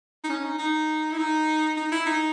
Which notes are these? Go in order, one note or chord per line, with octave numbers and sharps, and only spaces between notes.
D#4
C#4
D#4
D#4
E4
D#4
D#4
E4
D#4